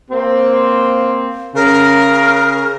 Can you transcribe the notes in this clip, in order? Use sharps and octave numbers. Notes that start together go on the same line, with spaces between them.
A#3 C4
C#3 A#4